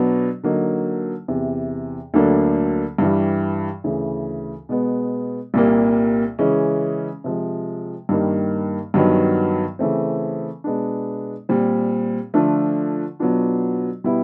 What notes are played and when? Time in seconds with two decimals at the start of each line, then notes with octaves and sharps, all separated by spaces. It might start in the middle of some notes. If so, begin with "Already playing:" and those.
Already playing: B2 F#3 B3 D4
0.44 D3 F#3 A#3 D#4
1.28 E2 C3 E3
2.14 D2 D3 F#3 A#3 D4
2.98 G2 E3 G3
3.84 D2 C#3 E3
4.69 B2 G#3 B3
5.54 C2 A#2 G3 A#3
6.39 C#3 E3 G#3 C#4
7.24 C3 F3 G#3
8.09 G2 D#3 G3 A#3
8.94 G2 D#3 F#3 B3
9.79 C#3 E3 A3 C4
10.64 B2 G#3 B3 D4
11.49 A#2 G3 C4
12.34 D3 F3 A3 D4 F4
13.20 B2 F#3 B3 D4 F4
14.04 B2 G3 B3 E4